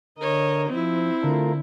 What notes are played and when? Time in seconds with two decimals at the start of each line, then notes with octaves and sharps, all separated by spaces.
0.19 D3 A#4 C#5 D#5
0.69 F3 C4 E4 G#6 D7
1.23 D3 A3 F4 A#4